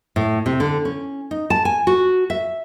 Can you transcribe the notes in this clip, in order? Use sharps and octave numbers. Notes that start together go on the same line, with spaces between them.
A2
C3
D3
C#4
D#4
A5
G#5
F#4
E5